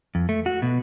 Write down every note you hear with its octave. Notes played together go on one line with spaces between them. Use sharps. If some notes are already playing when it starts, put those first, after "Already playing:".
F2
A3
F#4
B2